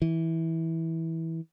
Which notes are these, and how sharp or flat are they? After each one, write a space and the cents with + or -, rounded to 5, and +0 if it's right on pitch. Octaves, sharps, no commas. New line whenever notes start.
E3 -15